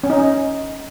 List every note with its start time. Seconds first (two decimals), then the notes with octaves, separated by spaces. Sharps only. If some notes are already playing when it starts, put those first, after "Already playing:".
0.04 C#4
0.10 D#4